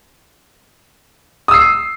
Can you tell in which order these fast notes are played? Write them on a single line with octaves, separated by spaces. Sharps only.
D#6 E6 C7